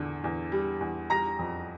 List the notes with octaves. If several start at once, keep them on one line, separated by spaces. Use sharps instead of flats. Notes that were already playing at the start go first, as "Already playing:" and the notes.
Already playing: E2 D3
E2
G3
E2
G3 A#5 A#6
F2